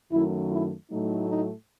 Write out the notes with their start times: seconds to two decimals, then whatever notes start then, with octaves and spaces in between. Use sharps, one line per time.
0.11 F#2 D#3 F#3 A3 E4
0.51 E4
0.90 A2 F#3 A3 D#4
1.29 D#4